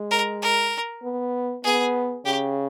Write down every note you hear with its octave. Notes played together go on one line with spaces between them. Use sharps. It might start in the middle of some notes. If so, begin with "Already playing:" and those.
Already playing: G#3
A#4
A#4
B3
B3 G#4
C#3 G4